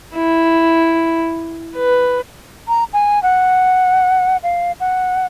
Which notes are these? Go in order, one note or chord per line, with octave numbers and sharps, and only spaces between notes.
E4
B4
A#5
G#5
F#5
F5
F#5